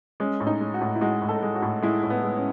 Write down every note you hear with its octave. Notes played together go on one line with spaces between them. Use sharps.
G#3 C#4
A2
D#4
G#3
F#4
A2
E4
G#3 F#4
A2
A4
G#3
F#4
A2
G#3 E4
A2
B3
G#3
C#4